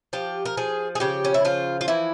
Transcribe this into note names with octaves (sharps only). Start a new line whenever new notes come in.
F3 G4
A#4
F3 G#4
G#4
C#3 G4
C#4
E4
F3 F4
F4
E3 E4